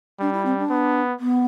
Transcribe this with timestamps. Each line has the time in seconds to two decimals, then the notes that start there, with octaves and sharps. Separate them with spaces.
0.20 G3 D4
0.32 E4
0.45 C4
0.58 D4
0.70 B3
1.19 B3